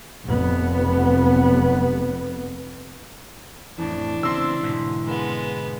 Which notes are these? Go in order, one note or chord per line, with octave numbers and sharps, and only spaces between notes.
F1 B3
F2 A2 E3 D4
C#3 C4 C6 E6
G#2 B2 D3
G#3 B3